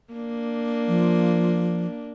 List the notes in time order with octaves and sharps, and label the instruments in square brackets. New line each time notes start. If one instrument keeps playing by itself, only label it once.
[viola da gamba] A#3 D4
[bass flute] F3